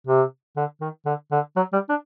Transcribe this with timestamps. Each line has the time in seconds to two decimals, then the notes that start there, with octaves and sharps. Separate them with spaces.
0.07 C3
0.57 D3
0.81 D#3
1.06 D3
1.32 D3
1.56 F#3
1.73 G3
1.89 D4